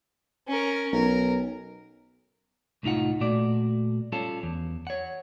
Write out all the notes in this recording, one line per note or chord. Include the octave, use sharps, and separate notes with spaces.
C#4 A#4
B1 A#4
C2 A2 D#4 F4 F#5
A#2 A3 F#4 D5
G3 C#4 F4 A4
E2
C#5 F#5